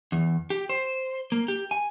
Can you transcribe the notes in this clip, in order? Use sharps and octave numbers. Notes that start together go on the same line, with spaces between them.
E2
G4
C5
A#3
G4
G#5